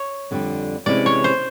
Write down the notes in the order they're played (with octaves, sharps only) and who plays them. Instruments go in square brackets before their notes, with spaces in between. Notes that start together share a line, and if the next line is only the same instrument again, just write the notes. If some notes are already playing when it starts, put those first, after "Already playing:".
Already playing: [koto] C#5
[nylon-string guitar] F2 D3 G3
[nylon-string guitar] C3 E3 G#3 C#4 E4 [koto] D5
[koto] C#5
C5